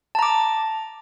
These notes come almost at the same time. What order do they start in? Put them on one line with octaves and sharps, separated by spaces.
A5 A#5 D6